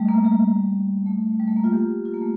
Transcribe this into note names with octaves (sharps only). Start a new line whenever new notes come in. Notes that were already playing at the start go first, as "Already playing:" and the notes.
Already playing: G3 A3
A#3
G3
A3
G3
A3
A#3
F4
G4
F4
A#3
A3